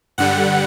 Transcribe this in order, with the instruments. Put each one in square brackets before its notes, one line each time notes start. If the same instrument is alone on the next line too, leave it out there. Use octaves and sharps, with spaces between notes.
[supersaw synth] G2 D3 G3 F#5